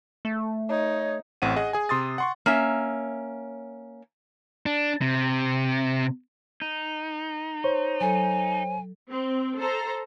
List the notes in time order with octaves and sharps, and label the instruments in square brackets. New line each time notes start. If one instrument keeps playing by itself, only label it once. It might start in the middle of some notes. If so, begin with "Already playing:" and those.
[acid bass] A3
[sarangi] D#4 [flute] C#5
[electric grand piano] A1 A2 C4 F#5 D#7
G#4 D#5 F#5
G#4 G#5
C3 C6 D#6 A6
F#5 C6 C#6
[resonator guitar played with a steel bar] A#3 C#4 E5
[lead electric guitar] D4
C3
[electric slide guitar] D#4
[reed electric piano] C5 C#5
[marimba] F#3 A4 [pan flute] G#5
[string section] C4
A4 C5 A#5